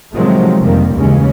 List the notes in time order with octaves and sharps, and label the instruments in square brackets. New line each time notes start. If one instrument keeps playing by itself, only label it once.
[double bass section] C3 D#3 F3 F#3 G#3 A3
F#1 F2 C3 D#3 G3 A#3
D#2 C#3 E3 G#3 C#4